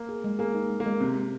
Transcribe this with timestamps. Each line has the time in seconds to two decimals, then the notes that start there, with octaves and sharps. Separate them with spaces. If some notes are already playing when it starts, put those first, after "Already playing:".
Already playing: A#3
0.09 G#4
0.24 G#3
0.39 A#3 G#4
0.55 D#4
0.70 G#3
0.80 A#3
0.86 G#3
1.00 C3 G#3
1.16 G#3